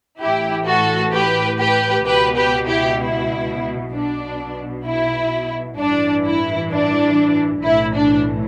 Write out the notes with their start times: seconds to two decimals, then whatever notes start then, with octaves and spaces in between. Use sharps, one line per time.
0.20 A1 A2 E3 E4 G4
0.67 F#4 A4
1.13 G4 B4
1.60 G4 B4
2.06 C#2 B2 G4 B4
2.37 G4 B4
2.68 E4 G4
3.00 E4
3.92 B1 B2 D4
4.85 E4
5.78 A1 G2 E3 D4
6.25 E4
6.72 D4
7.64 B1 A2 E3 E4
7.95 D4